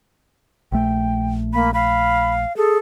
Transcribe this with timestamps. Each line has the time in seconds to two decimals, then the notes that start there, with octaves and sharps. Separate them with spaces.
0.72 A#1 A3 G5
1.53 A#3 B5
1.74 F5 B5
2.57 G#4 A4